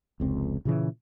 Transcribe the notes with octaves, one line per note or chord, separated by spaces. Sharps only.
F1 C#2 C4
A#2 C#3 E3